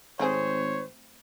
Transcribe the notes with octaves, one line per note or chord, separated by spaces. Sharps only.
G#1 A3 C4 G#4 C5 C#5